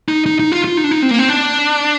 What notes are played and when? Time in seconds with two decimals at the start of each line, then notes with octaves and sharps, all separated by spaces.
0.09 D#4
0.26 D#4
0.39 D#4
0.52 F4
0.64 F4
0.77 D#4
0.84 D4
0.91 D#4
1.02 C4
1.11 A#3
1.19 C4
1.29 D4